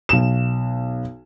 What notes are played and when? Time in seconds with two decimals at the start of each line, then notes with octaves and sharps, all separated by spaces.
0.09 B1 E7